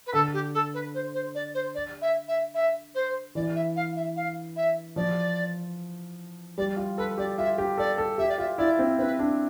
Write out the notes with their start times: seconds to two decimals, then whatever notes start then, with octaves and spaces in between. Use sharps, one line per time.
0.06 B4
0.13 D3 A4
0.33 G4
0.53 A4
0.73 B4
0.94 C5
1.14 C5
1.35 D5
1.54 C5
1.74 D5
2.01 E5
2.28 E5
2.54 E5
2.94 C5
3.35 E3 D5
3.55 E5
3.76 F5
3.96 E5
4.16 F5
4.56 E5
4.96 F3 D5
6.57 G3 D5
6.77 F4
6.97 A4 B4
7.18 G4 D5
7.38 F4 E5
7.58 G4
7.78 A4 D5
7.98 A4
8.18 G4 E5
8.28 D5
8.38 F4 E5
8.58 E4 D5
8.79 C4
8.99 C4 B4
9.19 D4